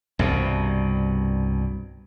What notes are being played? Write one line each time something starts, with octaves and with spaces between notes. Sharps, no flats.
C2 G2 B2